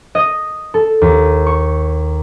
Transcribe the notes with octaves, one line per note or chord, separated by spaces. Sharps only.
D#5
A4
D#2
C#6